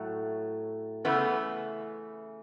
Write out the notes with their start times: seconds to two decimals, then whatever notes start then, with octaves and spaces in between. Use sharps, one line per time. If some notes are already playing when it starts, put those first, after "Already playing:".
Already playing: A2 F#3 A3
1.05 C#3 E3 A3 B3